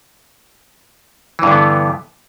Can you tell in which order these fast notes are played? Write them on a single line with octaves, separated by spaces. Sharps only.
E3 G2 D3 B3